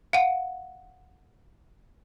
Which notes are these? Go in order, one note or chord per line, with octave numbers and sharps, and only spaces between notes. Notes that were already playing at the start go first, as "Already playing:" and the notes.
F5 F#5